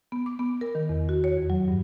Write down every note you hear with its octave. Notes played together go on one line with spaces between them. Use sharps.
B3
D6
B3
A#4
D#3
E2
F#4
C#5
F2
F#3
G2